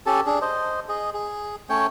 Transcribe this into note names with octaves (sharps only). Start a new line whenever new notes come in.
C#4 G4 A4 A5
D4 G#4
C5 D#5
G#4 D#5
G#4
A3 C#4 C#5 G5